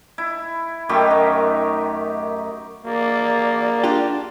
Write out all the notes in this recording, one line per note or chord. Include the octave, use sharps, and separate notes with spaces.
E4
F#2 D#3 A3 G4
D#4
A#3 F#4 G#4 D5
D4 F4 G4